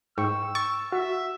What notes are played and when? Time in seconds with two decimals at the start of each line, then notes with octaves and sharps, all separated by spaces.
0.18 G#2 G5 C#6 E6
0.55 C#6 A6
0.92 F#4 E5